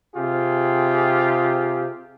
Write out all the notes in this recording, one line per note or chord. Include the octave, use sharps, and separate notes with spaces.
C3 F4 G4 G#4